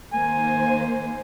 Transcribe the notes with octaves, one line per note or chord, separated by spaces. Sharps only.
D#3 A#3 C5 G#5